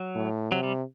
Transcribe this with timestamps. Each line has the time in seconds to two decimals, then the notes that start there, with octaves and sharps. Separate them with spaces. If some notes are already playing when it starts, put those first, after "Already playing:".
Already playing: F#3
0.16 A2
0.51 C3 F#3
0.63 G3